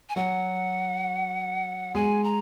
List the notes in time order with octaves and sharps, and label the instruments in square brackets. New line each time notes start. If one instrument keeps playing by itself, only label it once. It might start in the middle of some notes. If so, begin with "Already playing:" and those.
[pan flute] G#5
[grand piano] F#3 F#4 [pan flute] F#5
[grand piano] G#3 G#4 [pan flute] G#5
[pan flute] A#5